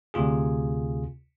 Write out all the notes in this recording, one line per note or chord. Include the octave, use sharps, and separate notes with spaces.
D2 C3 F4 G#4